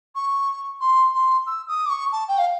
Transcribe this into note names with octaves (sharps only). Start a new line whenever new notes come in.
C#6
C6
C6
E6
D#6
D6
C#6
A5
G5
F5